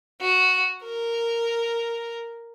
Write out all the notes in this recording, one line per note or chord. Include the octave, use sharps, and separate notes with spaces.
F#4
A#4